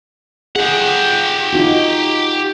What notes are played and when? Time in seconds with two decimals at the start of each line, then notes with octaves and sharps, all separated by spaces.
0.56 G4 G#4 F#5
1.53 D#4 F4 F#4